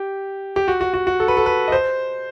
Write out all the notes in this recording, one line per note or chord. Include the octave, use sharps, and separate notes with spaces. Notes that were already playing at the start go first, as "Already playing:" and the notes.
Already playing: G4
G4
F#4
F#4
F#4
F#4
A4
B4
A4
B4
D#5
C5